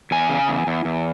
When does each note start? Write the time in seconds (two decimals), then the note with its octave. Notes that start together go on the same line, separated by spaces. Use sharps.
0.11 E2 G#5
0.29 C#3
0.48 E2
0.67 E2
0.85 E2